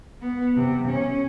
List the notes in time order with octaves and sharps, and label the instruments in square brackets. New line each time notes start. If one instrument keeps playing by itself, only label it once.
[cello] B3
C3
C#4